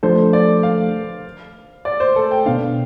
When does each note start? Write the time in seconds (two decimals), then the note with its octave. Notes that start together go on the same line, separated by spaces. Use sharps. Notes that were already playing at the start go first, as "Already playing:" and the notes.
0.03 F3 A3 D4 A4 C5
0.33 D5
0.63 F5
1.85 D5
2.00 C5
2.16 A4
2.31 G5
2.46 B2 B3 D4 F5